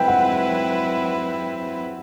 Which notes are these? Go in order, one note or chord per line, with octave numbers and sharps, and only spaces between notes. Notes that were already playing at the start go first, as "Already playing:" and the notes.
Already playing: F#3 C4 E4 B4 G5
F#5